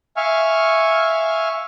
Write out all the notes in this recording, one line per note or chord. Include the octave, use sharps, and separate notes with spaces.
E5 F5 G#5 C#6 F6